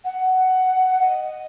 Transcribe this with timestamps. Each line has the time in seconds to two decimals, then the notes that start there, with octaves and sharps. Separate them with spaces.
0.04 F#5
1.00 D#5